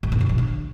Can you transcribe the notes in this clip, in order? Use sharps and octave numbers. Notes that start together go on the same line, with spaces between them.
G2
G#2
B2
E3
D3